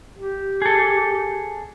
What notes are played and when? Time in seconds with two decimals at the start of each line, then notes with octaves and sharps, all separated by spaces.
0.18 G4
0.62 G#4 A4